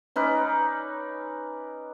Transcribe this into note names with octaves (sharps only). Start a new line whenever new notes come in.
C#4 D#4 B4 D5